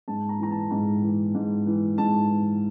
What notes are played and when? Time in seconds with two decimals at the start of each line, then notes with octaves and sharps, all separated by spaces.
0.08 G#2 A5
0.29 A#5
0.39 E3 A#5
0.50 A5
0.71 G#2 A#5
1.03 E3
1.35 G#2
1.66 E3
1.98 G#2 A5
2.29 E3